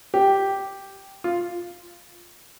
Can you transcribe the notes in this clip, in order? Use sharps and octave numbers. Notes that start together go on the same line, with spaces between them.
G4
F4